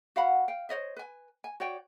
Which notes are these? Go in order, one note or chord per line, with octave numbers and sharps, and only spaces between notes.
F#4 F5 F#5 B5
F5 G5
C5 C#5 D#5 E5
B4 G#5
G#5
F#4 C#5 D5 G5